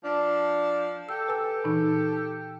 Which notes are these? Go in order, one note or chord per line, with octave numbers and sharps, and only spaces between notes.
F3 D4
G4 A4 E6
B4 G#5 E6
A#2 E3 D#4